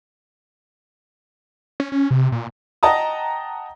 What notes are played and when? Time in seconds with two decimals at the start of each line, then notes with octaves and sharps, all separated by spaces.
1.80 C#4
1.92 C#4
2.11 C3
2.32 A#2
2.83 D#5 F#5 G5 A5 A#5 D#6